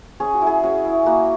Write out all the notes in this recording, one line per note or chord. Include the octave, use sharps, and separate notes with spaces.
C#4 G#4
F#4
E4
G#4
C#4 F#4
E4
A#3 F#4